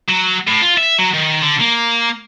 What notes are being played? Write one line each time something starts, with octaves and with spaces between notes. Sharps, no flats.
F#3
A2
F4
E5
F#3
D#3
D3
A#3